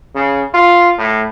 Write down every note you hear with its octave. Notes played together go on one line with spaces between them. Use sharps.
C#3
F4
A2